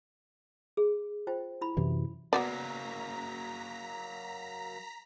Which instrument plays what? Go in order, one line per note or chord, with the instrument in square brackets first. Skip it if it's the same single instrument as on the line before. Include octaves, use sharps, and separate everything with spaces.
[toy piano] G#4
F4 C5 G5
E4 B5
[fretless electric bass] F#2 C3 E3
[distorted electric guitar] F#3 A#3 [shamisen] B3 F#4 D5 [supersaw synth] A#5 B6